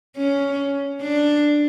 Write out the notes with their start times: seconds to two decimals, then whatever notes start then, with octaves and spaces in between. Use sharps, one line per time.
0.17 C#4
1.02 D4